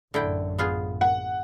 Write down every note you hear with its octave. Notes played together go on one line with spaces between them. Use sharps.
A1 F#2 A2 D3 E4 G5
B3 F4 G#4
F#5